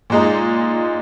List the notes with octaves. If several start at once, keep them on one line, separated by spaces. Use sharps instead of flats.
A#2 G#3 D#4